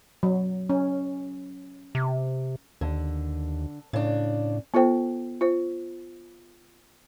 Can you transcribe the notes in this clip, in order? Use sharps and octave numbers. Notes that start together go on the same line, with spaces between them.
F#3
C#4
C3
D#2 D3
A2 C#3 D4
B3 F4 A4 C5 G5
F4 C5